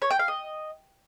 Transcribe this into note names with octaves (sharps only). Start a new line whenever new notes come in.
C#5
G5
F5
D#5